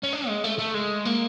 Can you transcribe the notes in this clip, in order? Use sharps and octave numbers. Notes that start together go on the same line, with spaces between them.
C#4
D4
G#3
A3
A3
G#3
A#3